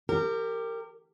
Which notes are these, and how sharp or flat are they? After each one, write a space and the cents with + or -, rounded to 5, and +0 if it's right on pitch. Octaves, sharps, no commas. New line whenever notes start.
G4 +15 A#4 -25